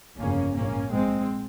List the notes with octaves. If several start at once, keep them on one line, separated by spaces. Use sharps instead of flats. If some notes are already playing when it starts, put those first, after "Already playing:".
G1 F2 C#3 A#3 C#4
A#1 G#2 A#3 C#4
A#1 A#2 G#3 C4